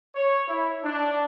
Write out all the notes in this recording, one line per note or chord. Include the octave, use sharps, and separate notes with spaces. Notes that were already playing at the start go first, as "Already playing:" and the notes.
C#5
E4
D4